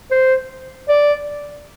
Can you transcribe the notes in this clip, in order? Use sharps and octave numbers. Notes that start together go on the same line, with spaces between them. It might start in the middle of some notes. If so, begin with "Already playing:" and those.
C5
D5